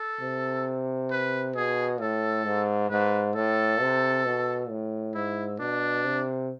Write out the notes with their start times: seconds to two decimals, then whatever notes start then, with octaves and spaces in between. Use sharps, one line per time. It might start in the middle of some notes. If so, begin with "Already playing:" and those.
Already playing: A4
0.21 C3
1.11 B4
1.56 B2 G#4
2.01 A2 A4
2.46 G#2
2.90 G#2 B4
3.35 A2 A4
3.81 C3
4.25 B2
4.70 A2
5.14 G#2 E4
5.59 B2 D4
6.04 C3